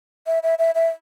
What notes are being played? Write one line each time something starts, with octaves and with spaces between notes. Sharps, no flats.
E5
E5
E5
E5